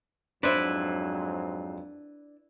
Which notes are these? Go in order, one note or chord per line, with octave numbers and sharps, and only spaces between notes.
F2 G#2 F#3 D4 E4 B4 C5